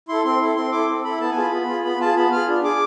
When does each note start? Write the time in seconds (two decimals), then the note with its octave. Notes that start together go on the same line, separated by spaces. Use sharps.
0.09 E4 A4 C6
0.25 C4 C6
0.41 E4 A4
0.56 C4 C6
0.72 E4 A4 D6
0.88 C4
1.04 E4 A4 B5
1.20 B3 A5
1.31 G#5
1.37 F4 G#4 B5
1.52 B3
1.68 F4 G#4
1.85 B3 B5
2.00 F4 G#4 A5
2.16 B3 B5
2.32 F4 G#4 F6
2.48 D4
2.63 G#4 D6